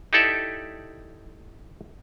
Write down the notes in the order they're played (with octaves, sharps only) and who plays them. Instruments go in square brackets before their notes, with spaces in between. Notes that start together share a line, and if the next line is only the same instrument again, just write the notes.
[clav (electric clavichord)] D#4 E4 G4 A4 D5 E5